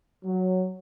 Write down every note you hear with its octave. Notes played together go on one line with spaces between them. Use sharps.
F#3